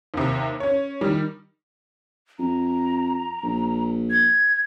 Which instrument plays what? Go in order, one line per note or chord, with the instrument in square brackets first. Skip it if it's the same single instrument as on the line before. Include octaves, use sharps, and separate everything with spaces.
[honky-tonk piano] D#2 C3
C#4 C#5
D#3 G3
[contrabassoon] F2 [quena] A#5
[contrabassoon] A#1
[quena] G#6